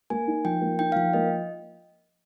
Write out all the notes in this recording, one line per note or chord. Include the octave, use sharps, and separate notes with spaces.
A#3 G#5
D#4
F3 G5
A#3
D#4 G5
F5
F3 G5
A#3 D#5